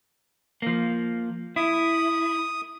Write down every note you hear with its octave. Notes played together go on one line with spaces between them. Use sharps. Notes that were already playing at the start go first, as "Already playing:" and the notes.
F3 A#3
E4 D#6